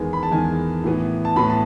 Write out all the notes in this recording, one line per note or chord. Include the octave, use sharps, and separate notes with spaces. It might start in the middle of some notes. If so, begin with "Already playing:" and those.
Already playing: E2 D#3 G#3 B3 G#5
B5
A5
E2 D#3 G#3 B3 G#5
A2 E3 B3
A5
A2 E3 B3 B5
A5